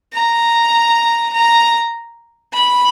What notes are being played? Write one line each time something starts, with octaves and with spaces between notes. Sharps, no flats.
A#5
A#5
B5